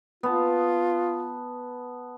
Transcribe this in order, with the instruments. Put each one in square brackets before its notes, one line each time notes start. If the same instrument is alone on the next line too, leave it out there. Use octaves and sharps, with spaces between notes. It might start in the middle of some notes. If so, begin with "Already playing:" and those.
[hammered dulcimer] B3 A5 [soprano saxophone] F4